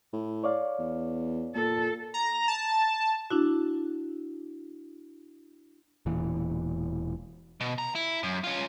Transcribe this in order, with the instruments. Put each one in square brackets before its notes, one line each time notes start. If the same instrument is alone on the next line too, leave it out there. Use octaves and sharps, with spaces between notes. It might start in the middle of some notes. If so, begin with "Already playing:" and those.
[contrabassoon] A2
[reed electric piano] C#5 D5 F5
[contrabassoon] E2
[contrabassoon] A#2 [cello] A4
[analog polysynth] A#5
A5
[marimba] D4 E4 F#4
[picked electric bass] E1 A#2 E3
[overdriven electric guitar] B2
A#5
E4
F#2
C#4 F4